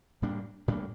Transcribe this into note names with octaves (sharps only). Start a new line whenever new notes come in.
A2 G3 A#3 D4
A2 G3 A#3 D4